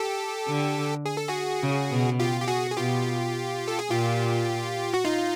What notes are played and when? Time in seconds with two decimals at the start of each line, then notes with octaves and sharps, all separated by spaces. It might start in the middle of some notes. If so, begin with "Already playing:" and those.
Already playing: G4 A4
0.48 D3
1.05 G#4
1.17 A4
1.28 F#4 G#4
1.63 C#3
1.90 B2
2.20 F4 G4
2.41 G4
2.48 F#4 G#4
2.71 G#4
2.77 B2 F4 G4
3.68 A4
3.79 G#4
3.90 A#2 F4 G4
4.94 F#4
5.05 D#4 F4